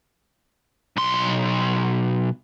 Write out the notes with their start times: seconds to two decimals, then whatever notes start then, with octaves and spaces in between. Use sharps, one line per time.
0.97 B1 C6